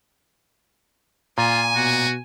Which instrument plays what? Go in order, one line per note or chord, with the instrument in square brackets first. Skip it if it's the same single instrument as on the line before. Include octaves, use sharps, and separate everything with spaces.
[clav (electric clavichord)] A#2 [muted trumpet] F4 [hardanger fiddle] G#5
[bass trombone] B2 [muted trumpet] F#4